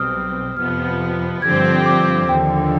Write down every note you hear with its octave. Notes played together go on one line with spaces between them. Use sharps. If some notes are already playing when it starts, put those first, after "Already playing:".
Already playing: B1 B2 G3 C4 D#6 F6
F2 C3 F3 B3 F6
G2 D3 F3 C4 G4 G#6
D6
D#2 D3 F3 G5